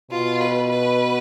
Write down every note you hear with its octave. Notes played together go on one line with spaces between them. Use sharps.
B2 F4
B4
B4